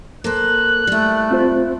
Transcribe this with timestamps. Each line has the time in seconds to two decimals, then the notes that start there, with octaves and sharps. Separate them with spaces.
0.24 A#3 A4 C5 F#6
0.87 G3 A3 E4
1.31 C4 F4 C5